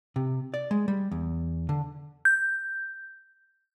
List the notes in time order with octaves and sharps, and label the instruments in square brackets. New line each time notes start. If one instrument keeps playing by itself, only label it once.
[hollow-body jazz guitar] C3
D5
G#3
G3
E2
D3
[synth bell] G6